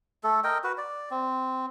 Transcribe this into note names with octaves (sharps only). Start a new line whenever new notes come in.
A3 A4
A#4 D#5 G5
F#4 B4
D5
C4